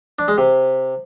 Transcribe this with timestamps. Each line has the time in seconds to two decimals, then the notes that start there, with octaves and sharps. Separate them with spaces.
0.19 D4
0.28 G#3
0.38 C3